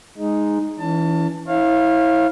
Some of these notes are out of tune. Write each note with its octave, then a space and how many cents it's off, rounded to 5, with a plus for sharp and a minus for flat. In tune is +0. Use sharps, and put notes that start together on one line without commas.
G#3 +0 D#4 +0
E3 +0 C#4 +40 A5 +25
E4 -25 C#5 -40 F5 +0